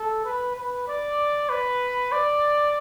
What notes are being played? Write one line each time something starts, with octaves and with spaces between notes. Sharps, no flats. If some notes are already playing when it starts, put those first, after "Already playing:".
Already playing: A4
B4
B4
D5
B4
D5